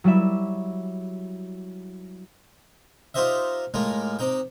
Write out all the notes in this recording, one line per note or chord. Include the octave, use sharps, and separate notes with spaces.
F#3 G3 E4 E5
D#4 F4 G4 C5 D#5 E5
A2 G#3 A#3 F4
C3 D#4 G5